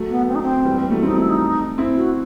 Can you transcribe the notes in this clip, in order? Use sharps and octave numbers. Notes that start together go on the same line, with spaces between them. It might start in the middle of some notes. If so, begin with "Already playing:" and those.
Already playing: F#3 A3
B3
C4
D#4
C4
E3 G3
E3 G3
F#3 A3
A3 C4 D#4
E4
D#4
C4 E4
F#4